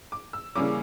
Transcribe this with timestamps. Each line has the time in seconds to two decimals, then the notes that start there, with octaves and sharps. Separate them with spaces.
0.12 D6
0.33 E6
0.56 C#3 E3 G3 A#3 C#4 D6